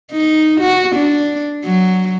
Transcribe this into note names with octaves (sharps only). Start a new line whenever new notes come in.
D#4
F#4
D4
F#3